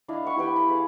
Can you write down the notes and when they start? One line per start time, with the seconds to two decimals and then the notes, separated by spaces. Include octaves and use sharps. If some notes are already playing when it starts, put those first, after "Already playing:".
0.08 D4 E4 D#5 F5
0.23 E5 F#5 C#6
0.36 E4 G4 B4 G5
0.56 B5 C6
0.68 G#4 B4 F5 G5